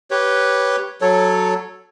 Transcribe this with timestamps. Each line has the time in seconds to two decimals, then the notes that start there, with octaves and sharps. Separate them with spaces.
0.11 G4 B4 C#5
1.01 F#3 A4 C#5